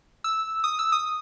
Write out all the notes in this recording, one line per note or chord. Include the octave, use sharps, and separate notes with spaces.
E6
D#6
E6
D#6